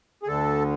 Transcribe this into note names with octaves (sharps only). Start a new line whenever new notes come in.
G#4
D2 D3 A4